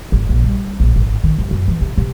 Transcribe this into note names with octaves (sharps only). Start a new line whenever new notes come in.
G#1
A#1
G3
A#1
G#1
D#3
G1
F#2
E3
C3
C3